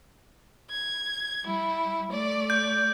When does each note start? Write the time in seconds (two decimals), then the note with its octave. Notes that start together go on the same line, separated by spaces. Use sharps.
0.70 G#6
1.45 G3 E4
2.11 A3 D5
2.50 G6